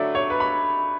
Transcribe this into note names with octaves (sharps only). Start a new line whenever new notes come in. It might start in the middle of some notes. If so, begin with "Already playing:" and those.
Already playing: D3 F#3 A3 D5 E5
C#5
B4
B5